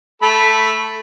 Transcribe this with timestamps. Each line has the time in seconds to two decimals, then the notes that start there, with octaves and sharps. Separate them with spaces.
0.22 A3 A4 B5